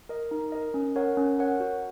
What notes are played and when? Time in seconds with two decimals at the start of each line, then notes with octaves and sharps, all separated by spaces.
0.09 A#4 D#5
0.31 D#4
0.52 A#4 D#5
0.74 C#4
0.96 A#4 C#5 F#5
1.17 C#4
1.39 A#4 C#5 F#5
1.60 F#4